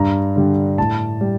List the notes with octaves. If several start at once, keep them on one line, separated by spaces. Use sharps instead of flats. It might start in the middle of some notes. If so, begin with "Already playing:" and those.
Already playing: G2 A#5
D3 G3
A2 A5
G3